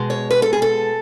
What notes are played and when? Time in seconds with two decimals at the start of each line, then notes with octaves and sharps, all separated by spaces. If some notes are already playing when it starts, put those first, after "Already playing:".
Already playing: B2 G#3
0.10 C#5
0.31 B4
0.42 A4
0.53 G#4
0.62 A4